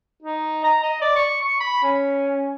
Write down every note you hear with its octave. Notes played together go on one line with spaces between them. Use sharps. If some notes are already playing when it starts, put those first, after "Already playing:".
D#4
A#5
D#5
D5
C#6
C#6
B5
C#4